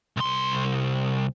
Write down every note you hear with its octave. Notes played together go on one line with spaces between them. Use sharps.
C2 C6